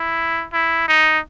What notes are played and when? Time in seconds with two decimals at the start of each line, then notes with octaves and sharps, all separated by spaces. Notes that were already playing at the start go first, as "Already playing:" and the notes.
Already playing: E4
0.53 E4
0.88 D#4